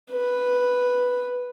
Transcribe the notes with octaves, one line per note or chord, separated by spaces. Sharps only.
B4